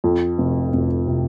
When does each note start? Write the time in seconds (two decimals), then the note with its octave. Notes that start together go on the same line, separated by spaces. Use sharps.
0.04 F2
0.38 F1
0.73 F1
1.07 C3